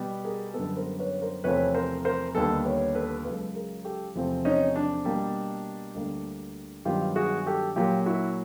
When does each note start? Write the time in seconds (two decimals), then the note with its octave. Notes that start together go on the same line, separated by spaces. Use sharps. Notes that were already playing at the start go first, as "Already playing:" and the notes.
Already playing: B2 G3 B3
0.25 G#4 A#4
0.54 F#2 D3 G3 B3 A4 B4
0.76 A#4 C5
0.99 B4 C#5
1.22 A#4 C5
1.44 E2 C3 F3 A3 C4 B4 C#5
1.74 A#4 C5
2.05 A#4 C5
2.35 D#2 D3 G3 B3 A4 B4
2.65 B4 C#5
2.95 A4 B4
3.25 C#2 C#3 F#3 A4 B4
3.55 G#4 A#4
3.85 G4 A4
4.15 E2 C3 F3 A3 C4
4.45 C#4 D#4
4.76 D4
5.05 B2 G3 A#3
5.95 D2 D3 G3 A#3
6.85 G2 D#3 F#3 B3 F4 G4
7.16 F#4 G#4
7.46 G4 A4
7.76 A#2 F#3 A#3 F4 G4
8.06 E4 F#4